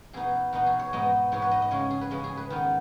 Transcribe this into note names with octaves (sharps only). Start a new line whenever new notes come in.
B2 B3 D#4 G#4
B2 B3 D#4 F#4
G#4
C#5
G#2 G#3 B3 D#4 D#5
G#2 G#3 B3 D#4 C#5
B4
D#5
D#5
C#3 G#3 C#4 C#5
G#4
B4
C#3 G#3 C#4
G#4
B4
D#3 B3 D#4